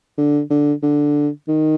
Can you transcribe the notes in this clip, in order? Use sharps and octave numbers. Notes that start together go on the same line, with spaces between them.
D3
D3
D3
D#3